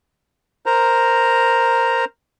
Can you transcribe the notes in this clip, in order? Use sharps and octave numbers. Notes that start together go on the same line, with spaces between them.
A#4 C5 A#5